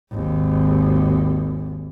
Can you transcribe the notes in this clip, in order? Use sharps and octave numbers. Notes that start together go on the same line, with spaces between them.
G#1 D#2